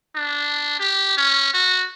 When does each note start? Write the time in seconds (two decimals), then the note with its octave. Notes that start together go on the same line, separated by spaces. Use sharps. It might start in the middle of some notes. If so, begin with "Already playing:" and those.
0.15 D4
0.80 G4
1.17 C#4
1.54 F#4